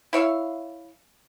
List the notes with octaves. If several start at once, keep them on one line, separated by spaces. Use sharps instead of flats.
E4 C#5 E5 F5